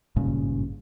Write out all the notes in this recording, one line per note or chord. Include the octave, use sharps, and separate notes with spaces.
G#1 G2 A#2 C#3